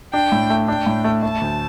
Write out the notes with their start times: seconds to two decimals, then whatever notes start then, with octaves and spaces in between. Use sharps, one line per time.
0.13 D4 G5
0.32 A2
0.50 A3
0.68 D4 G5
0.86 A2
1.04 A3
1.23 A3 A5
1.42 D2